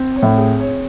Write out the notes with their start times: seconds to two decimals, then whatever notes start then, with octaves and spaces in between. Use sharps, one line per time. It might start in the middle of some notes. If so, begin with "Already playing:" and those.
Already playing: C4
0.16 C#5
0.23 A2
0.37 G#4
0.60 C#5